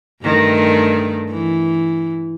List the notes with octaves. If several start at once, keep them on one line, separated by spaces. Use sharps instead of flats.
G2 D#3 A3
E3